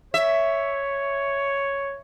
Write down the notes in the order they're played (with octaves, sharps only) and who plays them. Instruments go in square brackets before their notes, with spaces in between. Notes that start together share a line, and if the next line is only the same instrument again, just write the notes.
[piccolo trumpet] C#5 [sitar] E5